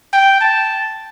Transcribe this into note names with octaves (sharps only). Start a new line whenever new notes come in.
G5
A5